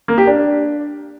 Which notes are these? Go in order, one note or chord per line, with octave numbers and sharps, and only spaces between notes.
A#3
G4
D4